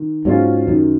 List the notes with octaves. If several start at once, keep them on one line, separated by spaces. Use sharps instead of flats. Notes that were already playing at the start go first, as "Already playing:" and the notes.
Already playing: D#3
G#2 F#3 C#4 F4
F#2 D#3